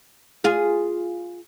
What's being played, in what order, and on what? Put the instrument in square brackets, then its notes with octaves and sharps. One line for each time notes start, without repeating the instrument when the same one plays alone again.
[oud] F4 G#4